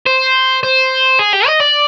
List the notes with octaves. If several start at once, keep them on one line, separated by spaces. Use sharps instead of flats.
C5
C5
G#4
G4
D#5
D5